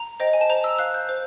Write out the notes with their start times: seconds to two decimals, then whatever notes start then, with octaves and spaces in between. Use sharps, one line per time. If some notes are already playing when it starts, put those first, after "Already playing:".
Already playing: A#5
0.20 C5 D#5 G5
0.33 G#5
0.41 A5
0.50 C5 A#5
0.64 E6
0.79 F5 F#6
0.94 G6
1.09 C5